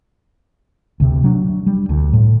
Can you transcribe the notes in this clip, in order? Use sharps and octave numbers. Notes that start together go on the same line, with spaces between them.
D2 C3
F#3 D4
G3
D2
A2